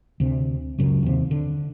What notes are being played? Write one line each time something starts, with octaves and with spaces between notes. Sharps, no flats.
D2 C3
C#2 F#2 C#3
D#2 C3
D3